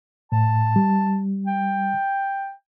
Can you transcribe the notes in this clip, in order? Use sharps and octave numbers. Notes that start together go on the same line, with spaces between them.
A2 A5
G3
G5